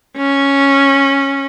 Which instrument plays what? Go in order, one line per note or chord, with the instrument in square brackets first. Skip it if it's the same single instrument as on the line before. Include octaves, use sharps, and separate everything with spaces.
[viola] C#4